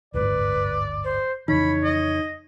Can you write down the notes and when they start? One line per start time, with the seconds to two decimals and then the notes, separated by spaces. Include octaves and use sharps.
0.14 D1 G1 G#2 B4 D5
1.04 C5
1.48 F2 C#3 E3 D#4 C#5 B5
1.84 D#5